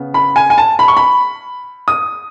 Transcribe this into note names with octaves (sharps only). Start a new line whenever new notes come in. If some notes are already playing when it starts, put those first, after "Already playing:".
Already playing: C#3 B3
B5
G#5
G#5
A5
B5
C#6
B5
D#6